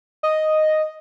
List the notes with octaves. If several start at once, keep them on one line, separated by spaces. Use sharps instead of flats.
D#5